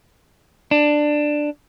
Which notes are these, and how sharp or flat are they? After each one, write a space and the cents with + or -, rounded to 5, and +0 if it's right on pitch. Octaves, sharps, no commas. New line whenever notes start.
D4 +10